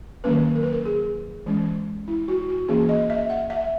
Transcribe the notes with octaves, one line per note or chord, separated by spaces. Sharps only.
D#3 F#3 A#3 C#4 B4
A#4
B4
A#4
G#4
E3 G#3 C#4
E4
F#4
F#4
E3 A#3 C#4 G#4
D#5
E5
F#5
E5